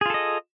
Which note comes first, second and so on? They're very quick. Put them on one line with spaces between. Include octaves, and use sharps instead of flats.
G#4 F4 A4 D#5